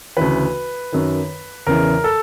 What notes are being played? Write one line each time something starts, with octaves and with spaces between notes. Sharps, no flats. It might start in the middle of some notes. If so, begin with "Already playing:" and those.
D2 C#3 E3 B4
F#2 D#3
E2 C#3 E3 A#4
A4